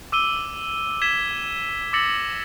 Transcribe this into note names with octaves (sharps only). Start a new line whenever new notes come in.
D6 E6 D#7 G7
G#6 B6 E7 G7
D6 E6 A6 A#6 C#7 F#7